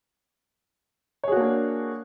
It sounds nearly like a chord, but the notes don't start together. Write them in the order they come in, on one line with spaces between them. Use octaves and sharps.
C#5 G#4 F#4 A#3 D4